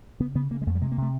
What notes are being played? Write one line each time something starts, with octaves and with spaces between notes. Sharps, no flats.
C#3 B3
C#3 B3
C#3 A#3
G#3
F2 A3
G3
C3 G#3
A#3
C3 A3